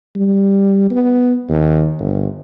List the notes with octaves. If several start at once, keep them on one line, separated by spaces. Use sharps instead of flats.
G3
B3
D#2
G1